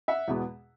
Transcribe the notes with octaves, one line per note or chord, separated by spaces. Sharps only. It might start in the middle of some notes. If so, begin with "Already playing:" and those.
E5 F#5
E2 B2 G#3 B3